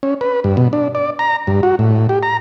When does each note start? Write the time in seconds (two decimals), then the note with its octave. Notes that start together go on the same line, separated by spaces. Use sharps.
0.03 C#4
0.21 B4
0.44 G2
0.57 B2
0.73 D4
0.95 D5
1.19 A#5
1.47 G2
1.63 F#4
1.79 A2
2.09 G4
2.23 A#5